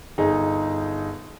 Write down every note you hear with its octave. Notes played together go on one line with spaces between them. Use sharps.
G1 D#4 G#4